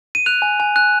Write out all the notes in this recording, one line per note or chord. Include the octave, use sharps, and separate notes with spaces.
D#7
F#6 F7
G#5
G#5
F#6